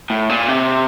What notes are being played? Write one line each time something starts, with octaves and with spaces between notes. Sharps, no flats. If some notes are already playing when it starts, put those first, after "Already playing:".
A2
A#2
C3